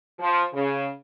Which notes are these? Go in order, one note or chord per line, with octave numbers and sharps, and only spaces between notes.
F3
C#3